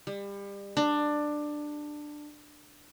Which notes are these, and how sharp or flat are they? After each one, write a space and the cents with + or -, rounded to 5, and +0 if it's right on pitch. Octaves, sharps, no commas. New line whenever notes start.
G3 +30
D4 +15